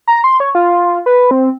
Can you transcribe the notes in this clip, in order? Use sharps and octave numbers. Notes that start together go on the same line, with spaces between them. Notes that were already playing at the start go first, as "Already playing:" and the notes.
A#5
C6
C#5
F4
B4
C4